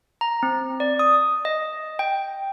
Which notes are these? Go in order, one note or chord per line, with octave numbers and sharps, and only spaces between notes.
A#5
C4
D5
D#6
D#5
G5